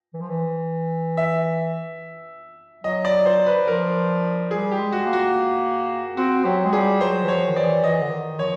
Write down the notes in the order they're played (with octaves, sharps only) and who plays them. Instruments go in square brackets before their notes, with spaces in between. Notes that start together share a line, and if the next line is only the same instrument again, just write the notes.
[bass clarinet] E3
F3
E3
[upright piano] E5
[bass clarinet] F#3 [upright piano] D#5
[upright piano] D5
C5
B4
[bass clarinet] F3 [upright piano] A#4
[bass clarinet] G3 [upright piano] G#4
[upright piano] G4
[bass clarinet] G#3
[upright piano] F#4
[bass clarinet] A#3
[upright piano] F#4
[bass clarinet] C4 [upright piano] F#4
[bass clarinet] F#3 [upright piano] G4
[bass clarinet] G#3
[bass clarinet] G3 [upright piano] G#4
[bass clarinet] F#3 [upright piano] C5
[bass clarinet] E3
[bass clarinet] F3 [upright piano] C#5
[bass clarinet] D#3
[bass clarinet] E3 [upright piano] D5
[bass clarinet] E3 [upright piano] D#5
[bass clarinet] D3
D#3
[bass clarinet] F3 [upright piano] C#5